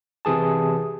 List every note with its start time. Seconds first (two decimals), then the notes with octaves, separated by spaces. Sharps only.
0.25 C3 E3 G#4 A5